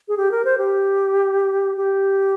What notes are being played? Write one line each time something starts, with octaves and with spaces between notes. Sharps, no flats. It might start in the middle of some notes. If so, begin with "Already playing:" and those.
G#4
G4
A#4
C5
G4
G4